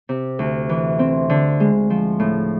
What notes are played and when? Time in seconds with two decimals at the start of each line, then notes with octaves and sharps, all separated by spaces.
0.09 C3
0.39 D2
0.69 E3
0.99 C4
1.30 D3
1.60 G#3
1.90 F3
2.20 A2